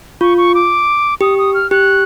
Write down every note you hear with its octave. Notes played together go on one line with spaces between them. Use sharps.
F4 C#6
C#6
D6
G4 D#6
D#6
F6
G4 F#6